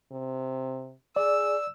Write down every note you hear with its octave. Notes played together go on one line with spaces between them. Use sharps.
C3
G#4 D5 E6